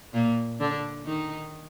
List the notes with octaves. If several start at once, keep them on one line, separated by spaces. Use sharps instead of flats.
A#2 A#3
D3 D4
D#3 D#4